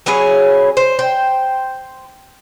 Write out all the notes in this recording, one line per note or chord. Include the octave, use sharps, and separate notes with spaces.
F#3 C#4 E4 G#4
C5
C5 G5